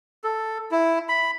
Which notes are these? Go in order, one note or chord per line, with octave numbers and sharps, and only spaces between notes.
A4
E4
B5